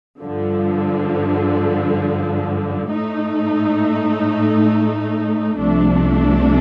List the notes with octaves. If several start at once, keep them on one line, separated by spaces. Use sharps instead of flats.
G2 D3 F3
A2 A3 D#4
C2 C3 F3 A3 D4